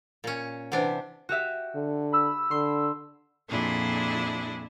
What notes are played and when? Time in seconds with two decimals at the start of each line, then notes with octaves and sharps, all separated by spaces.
0.24 A#2 C#4
0.72 C3 E3 D4 B4 C5 F#5
1.29 F#4 G4 E5
1.75 D3
2.12 B5 E6
2.51 D3 C6
3.48 F2 A#2 D4 E4 G#4